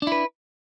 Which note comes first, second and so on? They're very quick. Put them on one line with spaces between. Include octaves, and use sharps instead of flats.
D4 E4 B4